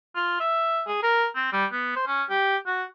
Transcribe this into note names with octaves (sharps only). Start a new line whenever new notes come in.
F4
E5
G#4
A#4
C4
G3
B3
C5
C#4
G4
F#4